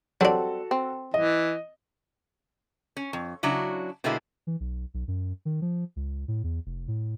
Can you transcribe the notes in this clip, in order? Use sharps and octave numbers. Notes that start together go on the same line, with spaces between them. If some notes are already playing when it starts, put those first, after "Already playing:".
F#3 G3 C4 D4 F#4 A4
C4
E3 D#5
C#4
F2
C#3 F#3 D4 E4 F#4
B2 D3 G3 G#3 A#3 E4
E3
B1
B1
F#2
D#3
F3
C#2
A2
E2
F1
A2